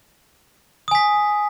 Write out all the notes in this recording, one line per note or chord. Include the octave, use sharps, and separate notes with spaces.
G#5 D#6 B6